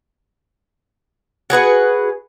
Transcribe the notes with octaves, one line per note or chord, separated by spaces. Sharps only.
F#4 G#4 B4 F#5